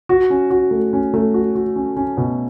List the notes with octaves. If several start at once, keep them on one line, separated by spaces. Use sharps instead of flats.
F#4
C#4
F#4
A3
C#4
A3
F#4
F#4
C#4
C#4
B2